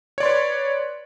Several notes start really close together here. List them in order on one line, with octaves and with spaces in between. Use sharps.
C#5 D5 C6 B4